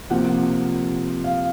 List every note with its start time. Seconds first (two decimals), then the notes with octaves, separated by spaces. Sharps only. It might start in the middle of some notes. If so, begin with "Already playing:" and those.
0.10 C3 F3 A#3 F#5
1.24 F5